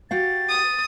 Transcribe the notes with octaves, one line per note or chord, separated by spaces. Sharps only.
F#4 G4 F5 A6
D#6